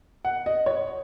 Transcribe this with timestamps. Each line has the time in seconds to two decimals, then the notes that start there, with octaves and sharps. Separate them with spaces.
0.25 F#5
0.46 D#5
0.66 C#5